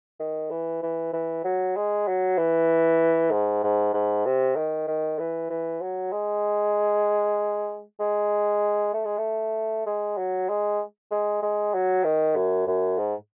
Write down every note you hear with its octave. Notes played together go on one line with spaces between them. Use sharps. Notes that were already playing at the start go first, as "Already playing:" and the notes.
D#3
E3
E3
E3
F#3
G#3
F#3
E3
G#2
G#2
G#2
C3
D#3
D#3
E3
E3
F#3
G#3
G#3
A3
G#3
A3
G#3
F#3
G#3
G#3
G#3
F#3
D#3
F#2
F#2
G#2